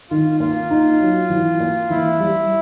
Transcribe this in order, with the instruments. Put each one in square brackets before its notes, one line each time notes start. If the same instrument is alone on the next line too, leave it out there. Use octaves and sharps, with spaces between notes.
[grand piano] D#3 [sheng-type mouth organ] F4
[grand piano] A#3 [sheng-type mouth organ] F4
[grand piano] D#4
F#3
E3
A#3
[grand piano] E3 [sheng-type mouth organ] E4
[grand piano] G3